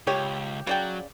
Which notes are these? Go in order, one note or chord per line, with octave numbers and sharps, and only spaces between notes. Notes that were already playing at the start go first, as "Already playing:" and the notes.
C#2 G4 C#5
C#3 F#3 D5 G5